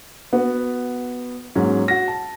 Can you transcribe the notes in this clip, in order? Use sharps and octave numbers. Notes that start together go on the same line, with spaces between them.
B3 F#4
G#2 F#3 A#3 C#4
F#4 A#6
A5